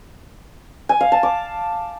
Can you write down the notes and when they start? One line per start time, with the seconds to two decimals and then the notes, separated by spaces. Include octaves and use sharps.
0.89 G#5
1.01 F5
1.12 A5
1.23 D6